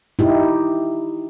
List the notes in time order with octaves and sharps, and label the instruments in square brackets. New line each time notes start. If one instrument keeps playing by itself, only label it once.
[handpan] D#4 E4 G4